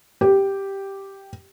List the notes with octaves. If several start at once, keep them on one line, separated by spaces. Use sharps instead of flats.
G4